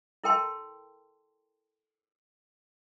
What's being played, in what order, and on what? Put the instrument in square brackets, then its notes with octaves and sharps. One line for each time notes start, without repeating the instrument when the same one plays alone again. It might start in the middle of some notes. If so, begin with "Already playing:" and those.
[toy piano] E4 A4 A#4 G5 A5 C6